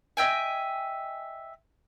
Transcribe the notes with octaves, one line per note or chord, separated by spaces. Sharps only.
D#5 E5 G5 G#5